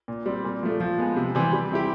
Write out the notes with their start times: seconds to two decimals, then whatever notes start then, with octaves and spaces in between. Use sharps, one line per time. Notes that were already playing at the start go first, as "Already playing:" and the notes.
0.08 A#2
0.26 G3 C4
0.44 A#2
0.63 F3 A3
0.80 F3
0.98 G#3 B3
1.16 C3
1.35 E3 G3 C4
1.53 G3
1.71 C4 E4 G4